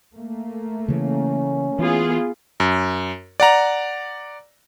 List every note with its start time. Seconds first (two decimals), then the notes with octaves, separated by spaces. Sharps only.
0.16 A3 A#3
0.88 C#3 E3 C#4
1.79 E3 B3 F4 G#4
2.60 F#2
3.40 D5 F#5 A#5